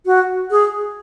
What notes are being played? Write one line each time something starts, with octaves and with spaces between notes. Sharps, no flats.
F#4
G#4